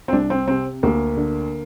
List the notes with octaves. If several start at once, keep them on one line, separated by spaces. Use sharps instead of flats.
C4
C2 D4
C4
C3 C4
D2 A#3
D3